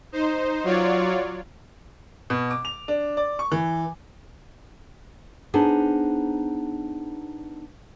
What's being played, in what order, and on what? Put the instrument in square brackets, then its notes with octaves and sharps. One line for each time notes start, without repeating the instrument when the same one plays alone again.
[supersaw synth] D#4 C5
F#3 F4 C#5 D5
[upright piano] B2
D6
F7
D4
D5
C#6
E3
[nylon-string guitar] B3 D4 D#4 G#4 C5